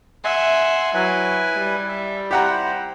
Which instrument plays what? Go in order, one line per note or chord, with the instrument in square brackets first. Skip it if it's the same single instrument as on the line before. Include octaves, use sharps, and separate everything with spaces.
[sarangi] E5 [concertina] F#5 G#5 C6
[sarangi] F#3 [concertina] E4 B4 G#5
[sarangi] G3
[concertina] E5
[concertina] E4 C5 [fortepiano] G4 F#5 A#5